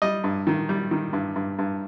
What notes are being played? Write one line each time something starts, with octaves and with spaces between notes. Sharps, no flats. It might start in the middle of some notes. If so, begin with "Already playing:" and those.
G3 D#5
G2
D#3
G3
D#3
G2
G2
G2